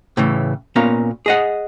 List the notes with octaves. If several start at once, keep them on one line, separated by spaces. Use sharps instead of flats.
A2 C#3 E3
A#2 B3 C#4 A#4 F5
G#4 D#5 F#5